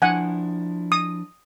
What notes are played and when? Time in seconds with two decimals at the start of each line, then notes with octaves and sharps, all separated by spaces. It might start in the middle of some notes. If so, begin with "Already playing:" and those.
0.02 F3 D4 E4 F#5 G#5
0.92 D#6